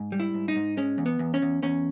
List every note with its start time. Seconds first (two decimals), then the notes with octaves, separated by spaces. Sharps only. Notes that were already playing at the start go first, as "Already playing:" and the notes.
Already playing: G#2
0.12 G3
0.20 E4
0.34 G#2
0.48 D#4
0.56 G#2
0.77 G#3 C#4
0.98 E2
1.06 B3
1.19 E2
1.34 C#4
1.42 E2
1.63 E2 C#4